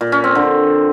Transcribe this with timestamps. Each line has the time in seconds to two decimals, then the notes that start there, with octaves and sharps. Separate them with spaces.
0.01 A#2
0.12 C#4
0.24 C4
0.35 D3